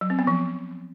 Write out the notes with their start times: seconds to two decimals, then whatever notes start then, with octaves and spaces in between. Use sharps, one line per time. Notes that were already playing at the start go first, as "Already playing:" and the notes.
0.01 F#3
0.10 C4
0.19 B3
0.27 F3